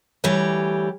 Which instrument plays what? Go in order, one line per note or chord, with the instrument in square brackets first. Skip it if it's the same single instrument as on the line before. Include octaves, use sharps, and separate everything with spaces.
[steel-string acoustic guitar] D2 E3 G3 G4 C#5